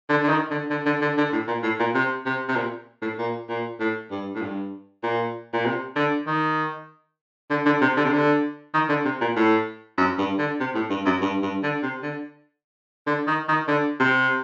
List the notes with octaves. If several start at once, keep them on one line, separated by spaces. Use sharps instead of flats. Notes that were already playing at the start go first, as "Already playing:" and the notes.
D3
D3
D#3
D3
D3
D3
D3
D3
A2
A#2
A2
A#2
C3
C3
C3
A#2
A2
A#2
A#2
A2
G2
A2
G2
A#2
A#2
C3
D3
D#3
D3
D3
C3
D3
C3
D3
D#3
D3
C3
A#2
A2
F#2
G2
D3
C3
A2
G2
F#2
G2
G2
D3
C3
D3
D3
D#3
D#3
D3
C3